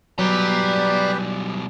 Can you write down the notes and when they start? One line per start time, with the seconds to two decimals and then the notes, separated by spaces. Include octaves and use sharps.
0.19 B2 F#3 G3 G4 B4 D5 A#5